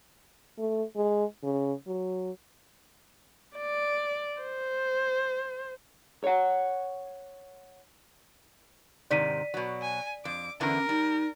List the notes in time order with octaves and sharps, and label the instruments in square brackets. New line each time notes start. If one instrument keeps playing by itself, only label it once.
[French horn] A3
G#3
C#3
F#3
[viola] D5
C5
[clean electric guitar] C#5 F#5
[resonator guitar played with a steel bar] G#2 C3 D#3 [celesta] D5 B6 D#7
[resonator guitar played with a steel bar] B2 F#3
[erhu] G#5
[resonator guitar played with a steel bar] F2 [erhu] D6
[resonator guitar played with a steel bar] E2 D3 E3 [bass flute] C#4 [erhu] A#4
[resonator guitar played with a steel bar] G3 [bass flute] D#4